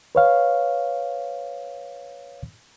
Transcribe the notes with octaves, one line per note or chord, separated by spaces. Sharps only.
B4 C#5 F5